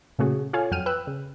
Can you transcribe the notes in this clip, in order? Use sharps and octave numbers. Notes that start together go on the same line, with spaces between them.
A#2 C#3 A3 C#4 F#4 G#4
F4 A4 C#5 F5 G#5
F2 F#3 G5 F6 D#7
B4 G5 E6 F#6
C#3